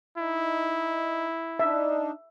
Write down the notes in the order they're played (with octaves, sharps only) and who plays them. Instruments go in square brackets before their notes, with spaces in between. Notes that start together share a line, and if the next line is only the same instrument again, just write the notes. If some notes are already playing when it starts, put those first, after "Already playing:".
[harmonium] D#4 [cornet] E4
[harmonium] D4 D#4 [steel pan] E5